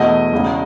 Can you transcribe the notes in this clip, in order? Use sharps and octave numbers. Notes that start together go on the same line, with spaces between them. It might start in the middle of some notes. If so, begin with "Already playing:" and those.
Already playing: E2 B2 A3 D#5
E1 E2 C#3